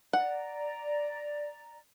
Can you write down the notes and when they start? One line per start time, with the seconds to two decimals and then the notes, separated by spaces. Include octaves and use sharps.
0.13 D5 F#5 A#5